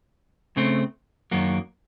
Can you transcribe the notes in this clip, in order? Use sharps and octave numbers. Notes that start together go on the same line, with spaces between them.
C#3 A3 C4
F#2 D#3 F#3 A#3